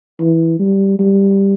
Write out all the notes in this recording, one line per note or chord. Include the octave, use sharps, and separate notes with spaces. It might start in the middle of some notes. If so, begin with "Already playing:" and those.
E3
G3
G3